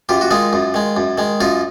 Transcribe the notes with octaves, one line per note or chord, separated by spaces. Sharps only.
F#2 F4 G4
F#4
D#3 G#3 D#4 F4
F#2
D#3 G#3
F#2
D#3 G#3
F#2 D#4 F4